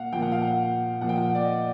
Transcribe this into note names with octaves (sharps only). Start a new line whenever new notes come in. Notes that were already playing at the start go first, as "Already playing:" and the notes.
Already playing: A#2 F5 F#5
A#2 F3 G5
F#5
F5
F#5
A#2 F3 F#5
G5
F#5
D5
D#5